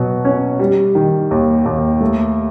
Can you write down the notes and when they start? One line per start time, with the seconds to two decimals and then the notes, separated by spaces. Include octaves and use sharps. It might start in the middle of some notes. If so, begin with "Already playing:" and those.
Already playing: B2 F#3
0.25 C#4
0.60 G3
0.95 D#3
1.31 D#2
1.66 D#2
2.01 A3